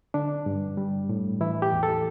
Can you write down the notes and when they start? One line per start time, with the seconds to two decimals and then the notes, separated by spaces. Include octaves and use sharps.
0.14 D3 D4
0.46 G2
0.77 G3
1.09 A2
1.41 E3 E4
1.62 G4
1.73 E2
1.83 A4